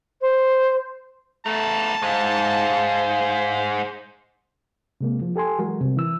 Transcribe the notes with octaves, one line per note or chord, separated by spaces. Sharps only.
C5
A3 B3 A#4 A5
G#2 G#3 C5 F5
C3 G#3 A#3
F3
G4 A4 G#5 C6
E3 F#3 G#3 F#4 A#4
C3 G3
E3 E6